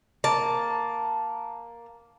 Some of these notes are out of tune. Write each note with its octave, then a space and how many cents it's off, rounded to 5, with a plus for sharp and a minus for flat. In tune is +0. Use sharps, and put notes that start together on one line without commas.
A#3 +5 A5 +0